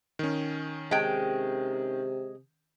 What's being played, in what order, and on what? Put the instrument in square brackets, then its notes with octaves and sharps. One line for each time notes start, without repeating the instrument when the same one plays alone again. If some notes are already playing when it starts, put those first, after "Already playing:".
[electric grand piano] D#3 C#4
[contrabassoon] C3 [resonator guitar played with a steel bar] G#3 G5